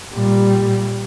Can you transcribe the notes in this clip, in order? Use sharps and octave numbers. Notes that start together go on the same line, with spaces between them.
A#2 G3